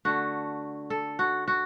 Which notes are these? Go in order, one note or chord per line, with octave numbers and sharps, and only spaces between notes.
D3 A3 F#4
A4
F#4
F#4